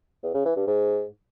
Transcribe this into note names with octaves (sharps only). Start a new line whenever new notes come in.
E2
C#3
E3
G2
G#2